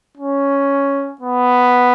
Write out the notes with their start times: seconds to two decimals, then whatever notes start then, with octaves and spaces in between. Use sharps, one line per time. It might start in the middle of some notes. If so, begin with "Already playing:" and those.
0.17 C#4
1.21 B3